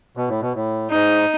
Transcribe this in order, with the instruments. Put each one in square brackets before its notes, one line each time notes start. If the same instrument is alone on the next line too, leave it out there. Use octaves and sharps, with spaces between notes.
[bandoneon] B2
A2
B2
A2
[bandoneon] G#2 [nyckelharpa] D#4